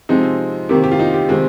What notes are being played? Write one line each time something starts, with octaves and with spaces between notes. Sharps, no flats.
C3 F3 G#3 C4 D#4
C3 D#3 A#3 G4
G4
F4
D#4
G4
C3 D#3 G#3 C4